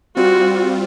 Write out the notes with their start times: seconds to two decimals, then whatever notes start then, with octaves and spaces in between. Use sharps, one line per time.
0.17 G3 C4 F4 F#4